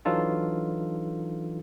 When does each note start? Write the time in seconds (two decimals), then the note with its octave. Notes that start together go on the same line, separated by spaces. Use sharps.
0.05 E3 F#3 D4 D#4 F4 A4